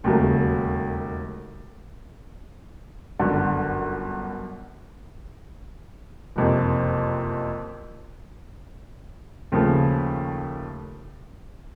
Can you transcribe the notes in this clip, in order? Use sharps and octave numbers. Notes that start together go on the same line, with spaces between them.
E1 D#2 C#3 F#3 A3
G1 F#2 D3
F#1 F2 C3
D#2 C#3 F3 A3